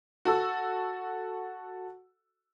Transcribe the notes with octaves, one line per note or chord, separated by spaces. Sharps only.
F#4 A4 E6